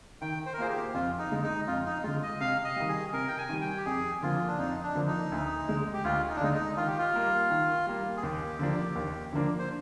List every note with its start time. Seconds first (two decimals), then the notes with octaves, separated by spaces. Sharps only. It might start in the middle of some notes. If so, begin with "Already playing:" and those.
0.22 D#3 G5
0.46 C5
0.54 A#4
0.58 A#3 F4 G#4 C5
0.70 G4
0.94 F2 F4
1.18 D#4
1.31 D3 G#3
1.44 D#4
1.67 F2 F4
1.86 D#4
2.04 D3 G#3 F4
2.23 D#5
2.40 C3 F5
2.64 D#5
2.76 D#3 G3
2.89 G#4
3.13 C3 A#4
3.28 G5
3.38 G#5
3.49 D#3 G3
3.61 G5
3.78 G4
3.86 F2 G#4
4.22 D3 F3 A#3 F4
4.47 D4
4.58 F2 D#4
4.83 D4
4.95 D3 F3 A#3
5.07 D#4
5.32 D2
5.68 D3 G#3
5.94 G4
6.04 D2 F4
6.29 D#4
6.36 D4
6.41 D3 G#3 D#4
6.54 D#4
6.77 D#3 F4
6.88 G4
6.98 F4
7.14 G3 A#3
7.50 D#3
7.87 G3 A#3
8.17 G#4
8.23 D#2 G4
8.59 D3 F3 A#3 D4
8.95 D#2
9.33 D3 F3 A#3 D4
9.59 C5